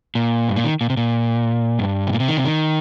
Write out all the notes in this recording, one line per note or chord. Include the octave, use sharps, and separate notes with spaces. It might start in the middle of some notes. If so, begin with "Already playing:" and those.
A#2
G2
A#2
D#3
A#2
C3
A#2
G2
C3
A#2
C3
D#3
C3
D#3